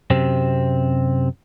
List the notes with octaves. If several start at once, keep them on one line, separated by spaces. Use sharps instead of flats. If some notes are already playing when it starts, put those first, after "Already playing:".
F#2 C3 C4